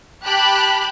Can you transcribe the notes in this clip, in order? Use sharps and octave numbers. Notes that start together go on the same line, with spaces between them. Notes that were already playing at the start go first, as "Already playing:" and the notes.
G4 A5 B5 F#6